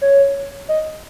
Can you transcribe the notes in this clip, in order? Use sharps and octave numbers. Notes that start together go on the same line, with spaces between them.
C#5
D#5